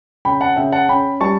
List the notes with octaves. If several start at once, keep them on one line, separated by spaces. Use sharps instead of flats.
C#3 G5 B5
F#5 A5
C#3 E5 G5
F#5 A5
C#4 G5 B5
G3 A5 C#6